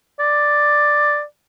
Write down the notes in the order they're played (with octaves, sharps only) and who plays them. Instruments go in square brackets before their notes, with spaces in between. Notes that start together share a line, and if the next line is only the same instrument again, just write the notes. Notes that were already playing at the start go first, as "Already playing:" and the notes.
[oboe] D5